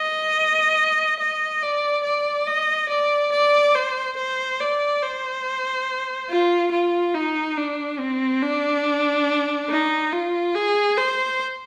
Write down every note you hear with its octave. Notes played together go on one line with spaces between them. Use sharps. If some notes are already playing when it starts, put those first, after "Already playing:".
Already playing: D#5
D#5
D5
D5
D#5
D5
D5
C5
C5
D5
C5
F4
F4
D#4
D4
C4
D4
D#4
F4
G#4
C5